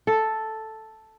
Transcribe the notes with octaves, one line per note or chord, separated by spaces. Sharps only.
A4